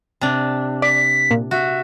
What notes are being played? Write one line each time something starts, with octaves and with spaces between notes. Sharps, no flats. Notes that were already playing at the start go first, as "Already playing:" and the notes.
C3 D4
D5 B6
A#2
F#4 E5